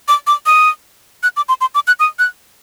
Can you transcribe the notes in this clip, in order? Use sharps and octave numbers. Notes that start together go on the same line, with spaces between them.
D6
D6
D#6
F#6
D6
C6
C6
D6
F#6
D#6
F#6